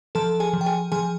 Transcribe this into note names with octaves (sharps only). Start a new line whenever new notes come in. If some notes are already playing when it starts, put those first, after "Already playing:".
F3 A4 A5
G#4 G#5
F3
G5
G#4 G#5
F3 G#4 G#5